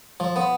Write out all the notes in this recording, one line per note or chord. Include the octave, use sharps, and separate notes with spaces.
F3
B3